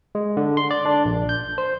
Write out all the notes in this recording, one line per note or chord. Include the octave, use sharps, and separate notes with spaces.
G#3
D3
C6
D5
D4
A#1
G6
C5